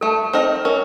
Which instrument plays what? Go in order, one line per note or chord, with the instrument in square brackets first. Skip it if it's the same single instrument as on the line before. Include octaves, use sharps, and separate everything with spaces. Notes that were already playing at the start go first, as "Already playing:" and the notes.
[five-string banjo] A3 [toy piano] A4
[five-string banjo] C4 D#4 A#4 D#5
[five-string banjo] C#4 [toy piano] A#4